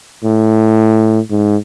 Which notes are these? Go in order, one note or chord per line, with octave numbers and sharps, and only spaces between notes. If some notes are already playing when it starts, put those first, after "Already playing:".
A2
G#2